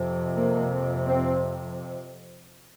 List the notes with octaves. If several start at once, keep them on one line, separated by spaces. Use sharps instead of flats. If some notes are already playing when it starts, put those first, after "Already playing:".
Already playing: F2 C3
A#3
C4